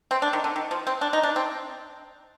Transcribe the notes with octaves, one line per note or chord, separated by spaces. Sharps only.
C4
D4
D#3
D3
D#3
F3
C4
D4
D#4
D4
C4